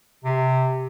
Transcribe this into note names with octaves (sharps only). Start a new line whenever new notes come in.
C3